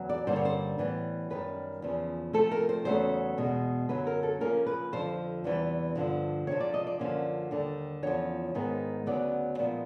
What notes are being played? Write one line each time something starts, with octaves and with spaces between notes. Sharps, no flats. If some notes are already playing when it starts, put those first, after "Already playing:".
Already playing: E2 C#3 F#3
D5
G2 D3 G3 A#3 C#4 C5
C#5
C5
A2 E3 G3 B3
F#2 D#3 G3 B4
E2 C#3 F3
C3 F3 A3 C4 A4
A#4
C5
E2 C#3 F#3 A3 C#4 C5
E2 B2 G#3
F#2 D3 F#3 B4
A#4
A4
C#3 F3 A#3 C#4 A#4
B4
F2 D3 F3 C5
E2 C3 E3 G3
G2 D3 F3
F2 C3 F3 C#5
D5
D#5
D5
F#2 D3 F3 A#3 C#4
D#2 D3 G3
E2 C#3 F3 C#5
G#2 D#3 G#3 B3
D2 C#3 F#3 B3 D5
A#2 F3 G#3 B3